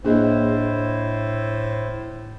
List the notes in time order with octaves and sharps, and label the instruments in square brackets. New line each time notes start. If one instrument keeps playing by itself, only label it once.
[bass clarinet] A2 [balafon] A#3 G#4 [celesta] D4 D#5 [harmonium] E4 C5